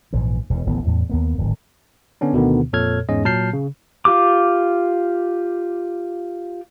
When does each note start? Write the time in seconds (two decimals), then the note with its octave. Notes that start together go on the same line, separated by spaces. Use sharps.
0.13 A#1 G#2 E3
0.50 E1 E2 B2
0.66 D1 A1 E3 B3
0.86 E2 A2
1.10 D#2 A#3 B3
1.38 D1 G#1 G2 D#3
2.21 D3 B3 C#4 D4
2.33 D2 B2 D3 D#3 B3
2.73 F2 A#2 A4 C#5 F6 G#6
3.09 E2 G#2 G#3 C#4 D#5
3.25 A#2 F#3 A5 F6 G6 C7
3.53 C#3
4.05 F4 G4 D6